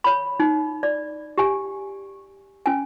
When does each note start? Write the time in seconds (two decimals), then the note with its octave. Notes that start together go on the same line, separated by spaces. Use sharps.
0.04 C#5 B5
0.40 D#4
0.83 D5
1.38 G4 G#5
2.66 C#4 G#5